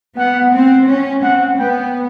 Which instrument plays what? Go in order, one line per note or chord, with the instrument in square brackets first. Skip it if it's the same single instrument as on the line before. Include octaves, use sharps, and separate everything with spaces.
[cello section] B3 [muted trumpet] F#5
[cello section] C4
C#4
[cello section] C4 [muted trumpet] F#5
[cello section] B3 [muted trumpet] G5